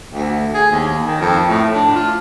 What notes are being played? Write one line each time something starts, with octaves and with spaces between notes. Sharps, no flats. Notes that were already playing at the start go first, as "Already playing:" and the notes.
D2
G#4
D#2
D#3
F2
A2
D4
F4